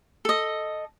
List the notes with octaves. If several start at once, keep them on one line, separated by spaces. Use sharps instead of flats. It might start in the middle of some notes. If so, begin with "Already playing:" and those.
A4 D#5